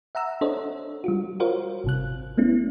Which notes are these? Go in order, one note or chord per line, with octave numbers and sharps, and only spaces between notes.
E5 F#5 A#5 E6
D4 A4 C5 C#5 D#5
G3 F4 F#4
F4 F#4 A#4 C5 C#5 F5
G#1 C3 F#6
A3 B3 C#4 E4